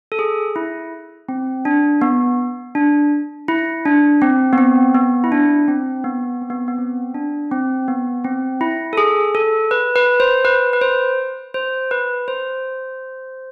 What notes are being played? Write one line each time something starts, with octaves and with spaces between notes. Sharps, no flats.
A4
G#4
E4
C4
D4
B3
D4
E4
D4
C4
B3
C4
B3
E4
D4
C4
B3
C4
B3
B3
C4
D4
C4
B3
C4
E4
A4
G#4
A4
B4
B4
C5
B4
B4
C5
C5
B4
C5